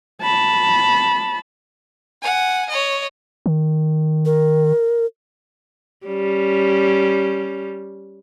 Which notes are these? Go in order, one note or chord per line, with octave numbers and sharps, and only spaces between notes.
A5 B5
F#5 G#5
C#5 D#5
D#3
A#4
G3 C#4